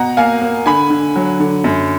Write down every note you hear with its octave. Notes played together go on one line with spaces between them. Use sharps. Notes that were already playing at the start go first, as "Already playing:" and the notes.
Already playing: B2 F#5 A#5
A#3 F5 G#5
A#3
D3 G#5 B5
D3
F#3
D3
F#2